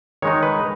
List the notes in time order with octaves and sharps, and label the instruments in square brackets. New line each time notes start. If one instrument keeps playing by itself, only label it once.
[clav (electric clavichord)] D#3 G#3 D#4 C#5
B4